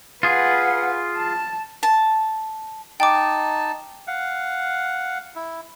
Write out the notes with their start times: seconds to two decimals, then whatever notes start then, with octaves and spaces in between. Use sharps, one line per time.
0.23 F4 G#4 B4 F#5
1.17 A5
1.83 A5
3.00 D#4 G5 A5 D6
4.07 F5 F#5
5.36 E4